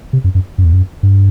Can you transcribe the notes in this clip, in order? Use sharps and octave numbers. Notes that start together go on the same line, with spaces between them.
C3
F#2
F#2
F#2
E2
F#2
G2